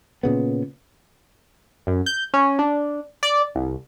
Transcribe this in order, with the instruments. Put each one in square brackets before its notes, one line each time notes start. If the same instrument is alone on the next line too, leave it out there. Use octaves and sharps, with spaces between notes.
[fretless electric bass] A#2 C#3 B3
[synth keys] F#2
G6
C#4
D4
D5
C2